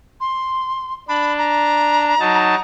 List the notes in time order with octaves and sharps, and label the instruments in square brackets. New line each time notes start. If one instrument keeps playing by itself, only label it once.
[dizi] C6
[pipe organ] D4 [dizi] B5
[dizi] A#5
[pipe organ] F#3 D#4 A5